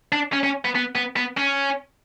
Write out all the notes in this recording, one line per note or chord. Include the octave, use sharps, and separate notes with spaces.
D4
C#4
C#4
B3
B3
B3
B3
C#4